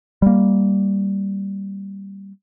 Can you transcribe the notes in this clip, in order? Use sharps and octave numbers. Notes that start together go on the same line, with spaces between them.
G3 A#3